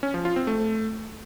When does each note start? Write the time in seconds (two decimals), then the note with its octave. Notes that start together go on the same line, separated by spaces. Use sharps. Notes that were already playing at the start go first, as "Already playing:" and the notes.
0.03 C#4
0.14 F3
0.25 F4
0.36 C4
0.47 A3